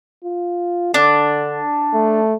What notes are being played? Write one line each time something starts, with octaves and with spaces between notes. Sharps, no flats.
F4
D3 D4
A3